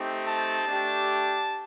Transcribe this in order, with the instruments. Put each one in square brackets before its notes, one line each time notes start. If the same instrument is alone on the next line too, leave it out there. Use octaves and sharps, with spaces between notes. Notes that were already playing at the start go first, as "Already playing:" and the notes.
Already playing: [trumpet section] A3 C4 D#4 G4
A5
A3 D4 G4